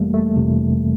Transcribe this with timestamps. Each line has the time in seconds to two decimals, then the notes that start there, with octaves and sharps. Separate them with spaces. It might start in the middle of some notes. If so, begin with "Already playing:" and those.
Already playing: G1 F2 C3 E3 G3 A3 A#3
0.14 A3
0.36 G1 F2 C3 E3